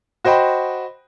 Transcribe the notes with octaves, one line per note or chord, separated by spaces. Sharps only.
F#4 C5 D#5 G5 B5